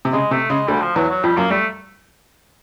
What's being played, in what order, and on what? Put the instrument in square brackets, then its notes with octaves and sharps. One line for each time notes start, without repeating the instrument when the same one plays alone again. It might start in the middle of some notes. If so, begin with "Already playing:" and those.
[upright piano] C3
[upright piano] C#3 [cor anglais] G#3
[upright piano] C3 [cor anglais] A3
[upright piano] C#3 [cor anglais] G#3
[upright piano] D2 D3 [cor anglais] G3
[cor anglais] F3
[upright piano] E2 E3 [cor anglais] F#3
[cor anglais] F#3
[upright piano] F2 F3 [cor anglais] G3
[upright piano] F#2 F#3 [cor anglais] A#3
[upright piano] G3 [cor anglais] A3